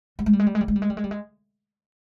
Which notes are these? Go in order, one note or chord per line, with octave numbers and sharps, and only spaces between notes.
G3
G#3
G3
G#3
G3
G#3
G3
G#3
G3
G#3
G3
G#3
G3
G#3